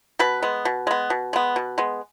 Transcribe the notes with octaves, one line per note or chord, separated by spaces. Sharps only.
B2 B4
G#3 B3
B2
G#3 B3
B2
G#3 B3
B2
G#3 B3